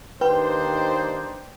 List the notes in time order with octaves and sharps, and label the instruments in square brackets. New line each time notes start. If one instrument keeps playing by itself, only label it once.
[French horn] D#2 [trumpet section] D4 D#4 C5 [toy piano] B4 [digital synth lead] G5